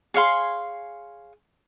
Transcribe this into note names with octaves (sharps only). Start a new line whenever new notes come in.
G#4 C#5 F5 C6